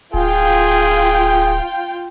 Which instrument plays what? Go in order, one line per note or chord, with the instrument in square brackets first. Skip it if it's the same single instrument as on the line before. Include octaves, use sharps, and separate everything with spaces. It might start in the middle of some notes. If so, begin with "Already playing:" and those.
[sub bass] D1 [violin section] F4 G5 [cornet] G#4